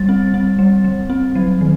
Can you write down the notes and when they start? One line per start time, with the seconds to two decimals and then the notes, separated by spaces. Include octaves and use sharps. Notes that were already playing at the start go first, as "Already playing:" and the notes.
Already playing: G3 A6
0.09 C4
0.34 C4
0.59 G3
0.84 G3
1.10 C4
1.35 F#3
1.61 D#3